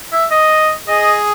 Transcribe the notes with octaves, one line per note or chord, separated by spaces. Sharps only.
E5
D#5
G#4 D#5